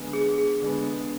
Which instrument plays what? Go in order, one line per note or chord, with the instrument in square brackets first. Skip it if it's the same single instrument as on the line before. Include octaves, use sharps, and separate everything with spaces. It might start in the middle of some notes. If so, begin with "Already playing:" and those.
Already playing: [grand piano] D3 G#3 B3
[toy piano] G#4
G#4
[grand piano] D3 G#3 B3